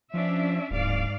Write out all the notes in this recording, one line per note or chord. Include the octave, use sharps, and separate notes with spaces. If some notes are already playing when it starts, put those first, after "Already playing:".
F3 C#4 D4 E5
D1 G#2 D5 F5